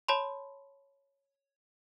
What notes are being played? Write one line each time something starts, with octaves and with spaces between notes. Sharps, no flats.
C#5 A5 B5 C6